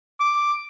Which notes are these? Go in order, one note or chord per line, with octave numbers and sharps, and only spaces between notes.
D6